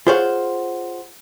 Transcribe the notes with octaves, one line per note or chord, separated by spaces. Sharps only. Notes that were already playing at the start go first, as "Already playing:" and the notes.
F4 G#4 C5 C#5 F5 F#5